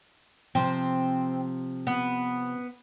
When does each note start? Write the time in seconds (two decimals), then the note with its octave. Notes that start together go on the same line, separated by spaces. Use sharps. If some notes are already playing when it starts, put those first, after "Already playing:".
0.55 C3 F3 C4
1.87 B3